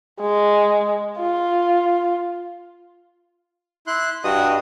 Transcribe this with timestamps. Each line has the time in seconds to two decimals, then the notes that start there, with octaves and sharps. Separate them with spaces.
0.21 G#3
1.20 F4
3.87 E4 C6 F#6
4.24 G2 F#4 D#5 D#6